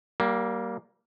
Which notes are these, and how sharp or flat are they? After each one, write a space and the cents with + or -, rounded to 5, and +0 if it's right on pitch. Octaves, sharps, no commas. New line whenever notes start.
G3 -25 A#3 +5